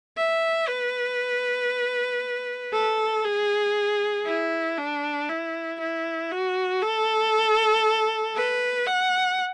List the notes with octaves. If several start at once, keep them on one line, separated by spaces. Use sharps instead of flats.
E5
B4
A4
G#4
E4
D4
E4
E4
F#4
A4
B4
F#5